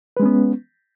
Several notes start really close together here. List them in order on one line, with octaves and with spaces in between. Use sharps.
B4 G#3 C#4 B3